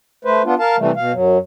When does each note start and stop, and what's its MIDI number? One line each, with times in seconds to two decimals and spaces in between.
0.25 0.42 57
0.25 0.42 71
0.25 0.42 72
0.45 0.54 59
0.45 0.54 62
0.45 0.54 65
0.59 0.76 70
0.59 0.76 77
0.59 0.76 81
0.78 0.91 48
0.78 0.91 52
0.78 0.91 55
0.78 0.91 57
0.96 1.12 47
0.96 1.12 77
1.12 1.38 42
1.12 1.38 54